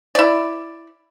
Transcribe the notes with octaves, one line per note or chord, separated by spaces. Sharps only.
E4 D5